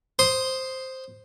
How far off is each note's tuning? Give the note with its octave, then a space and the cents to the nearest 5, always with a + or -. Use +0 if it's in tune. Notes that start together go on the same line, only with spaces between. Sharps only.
C5 +0 C6 +0 D#6 +0